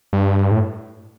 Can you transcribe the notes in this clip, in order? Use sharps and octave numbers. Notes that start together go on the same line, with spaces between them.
G2
A2